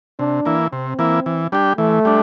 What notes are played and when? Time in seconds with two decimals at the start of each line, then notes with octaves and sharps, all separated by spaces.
0.19 C3 D4
0.45 E3 A#3 E4
0.73 C3 C4
0.99 E3 A#3 E4
1.26 E3
1.52 G3 D4 G4
1.78 E3 A3
2.05 G3 D4